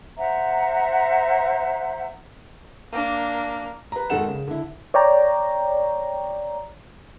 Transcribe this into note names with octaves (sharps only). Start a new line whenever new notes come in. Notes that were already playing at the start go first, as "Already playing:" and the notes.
C5 E5 F#5 A#5
A#3 D4
B4 A#5
G#1 D#3 D#4 A4 F#5 E7
C#3
D3 E4
C#5 D5 G5 A#5